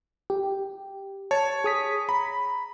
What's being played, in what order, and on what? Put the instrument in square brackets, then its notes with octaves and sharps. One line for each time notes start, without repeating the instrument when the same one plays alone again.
[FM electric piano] G4
[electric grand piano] C#5 [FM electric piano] A5
[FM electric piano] G#4 D#6 B6
[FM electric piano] A#5 [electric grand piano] B5